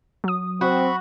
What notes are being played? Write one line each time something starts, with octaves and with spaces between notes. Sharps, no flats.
F#3 D#6
C4 F#4 B5 C#6